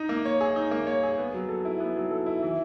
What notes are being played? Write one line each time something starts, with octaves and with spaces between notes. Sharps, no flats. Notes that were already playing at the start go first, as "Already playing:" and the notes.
Already playing: D#4
A#3
C#5
G#4
D#4
A#3
C#5
G#4
B3
F#3
A4
E4
B3
F#3
A4
E4
E3